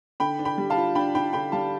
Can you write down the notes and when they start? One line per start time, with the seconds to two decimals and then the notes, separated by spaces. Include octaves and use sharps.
0.20 D3 G5 B5
0.39 D4
0.45 G5 B5
0.58 G3
0.70 F5 A5
0.77 F4
0.95 D4 G5 B5
1.15 D4 G5 B5
1.33 D3 G5 B5
1.52 G3 F5 A5